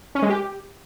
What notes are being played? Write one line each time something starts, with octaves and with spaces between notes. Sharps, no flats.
C#4
G#3
G4